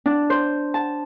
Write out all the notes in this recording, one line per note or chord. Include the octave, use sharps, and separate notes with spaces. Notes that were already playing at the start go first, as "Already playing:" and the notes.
D4
C5
A5